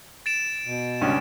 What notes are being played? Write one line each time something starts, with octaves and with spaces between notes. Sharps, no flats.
A6 D7 E7
B2
C#2 G2 C#4